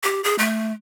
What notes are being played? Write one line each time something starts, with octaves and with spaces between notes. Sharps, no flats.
G4
G#4
A3